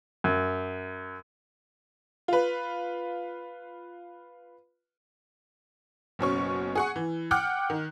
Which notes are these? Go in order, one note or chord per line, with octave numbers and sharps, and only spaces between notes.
F#2
F4 B4
F#1 B2 C#4 C#6
G#4 F#5 C#6
E3
F#5 G5 D6 F6 F#6
D#3